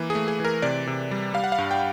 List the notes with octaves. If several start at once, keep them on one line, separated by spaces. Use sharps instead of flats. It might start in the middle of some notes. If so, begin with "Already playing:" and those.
Already playing: E3 A#3
G#4
A3
G#4
E3 A#4
C3 D5
C3
G3
G3 F5
F#5
F5
G2
G5